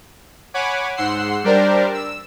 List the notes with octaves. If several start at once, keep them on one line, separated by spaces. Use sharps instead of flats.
C#5 F#5 G#5 B5 D6
G#2 F#5 C6 E6 C7
G3 D4 G4 A#4 C5 D5
E6